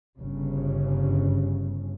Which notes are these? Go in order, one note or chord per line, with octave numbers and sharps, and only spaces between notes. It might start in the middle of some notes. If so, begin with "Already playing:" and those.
G1 C#3